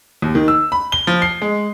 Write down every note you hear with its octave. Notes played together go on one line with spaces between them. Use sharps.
D#2
D#3
E6
B5
G7
F3
C7
G#3